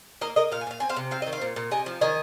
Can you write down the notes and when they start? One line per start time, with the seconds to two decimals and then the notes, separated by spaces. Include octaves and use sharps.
0.21 A#3 A#4 D#5
0.36 A#3 A#4 D#5
0.51 A#2 F5
0.61 G#5
0.67 A#2 F5
0.80 C4 G#5
0.89 C5 F5
0.96 C3
1.11 C4 F5
1.22 D#3 D#5
1.32 C5 F5
1.41 A#2
1.56 A#2
1.71 C3 D#5 G#5
1.86 F3
2.01 D#3 D#5 G#5